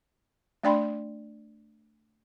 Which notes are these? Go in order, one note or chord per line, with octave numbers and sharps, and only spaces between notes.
A3 D4 D5 G5 B5 C6